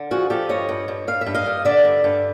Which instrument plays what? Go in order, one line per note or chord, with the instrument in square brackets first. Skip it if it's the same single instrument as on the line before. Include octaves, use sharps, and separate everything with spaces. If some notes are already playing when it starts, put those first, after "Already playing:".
Already playing: [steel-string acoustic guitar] D3
F3 F#4 G#4
F3 G4 A4
G2 C#5 D#5
G2
G2
G2 F5
E5
G2
D#5 F5
G2
D3 D5 E5
G2
G2